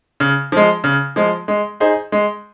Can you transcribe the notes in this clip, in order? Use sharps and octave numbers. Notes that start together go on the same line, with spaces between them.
C#3
F3 G#3
C#3
F3 G#3
G#3
D#4 G#4 C5
G#3